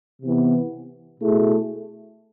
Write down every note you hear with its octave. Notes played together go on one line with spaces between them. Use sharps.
C3 E3 B3
B2 A3 E4 G#4